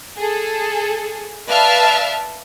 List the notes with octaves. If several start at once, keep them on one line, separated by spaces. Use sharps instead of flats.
G#4 A4
B4 D5 E5 F5 A5 F6